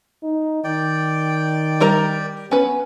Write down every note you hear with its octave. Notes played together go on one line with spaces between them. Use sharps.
D#4
D#3 D5 G5
G3 A#4 A#5
B3 C#4 B4